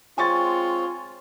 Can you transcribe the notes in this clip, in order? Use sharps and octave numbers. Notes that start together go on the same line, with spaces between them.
G#3 C4 F4 C#5 G#5 C#6 A6